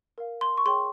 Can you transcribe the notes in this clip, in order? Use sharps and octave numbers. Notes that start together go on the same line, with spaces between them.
A#4 F5
C6
C#6
G#4 C#5 G5 C6